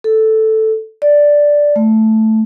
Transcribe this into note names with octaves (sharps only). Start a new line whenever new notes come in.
A4
D5
A3